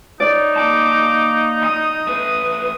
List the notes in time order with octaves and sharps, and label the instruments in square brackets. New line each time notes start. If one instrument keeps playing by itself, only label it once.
[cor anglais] D#4 [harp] D5
[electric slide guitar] A#3 A5 [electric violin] D6
[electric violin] D#6
[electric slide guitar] A3 B4